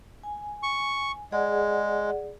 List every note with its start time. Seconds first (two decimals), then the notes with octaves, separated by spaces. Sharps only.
0.23 G#5
0.63 C#6
1.32 G#3 G#4 D5 F#5